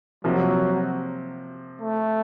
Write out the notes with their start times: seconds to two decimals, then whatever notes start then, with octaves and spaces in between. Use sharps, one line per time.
0.24 C3 F3 F#3 A#3
1.81 A3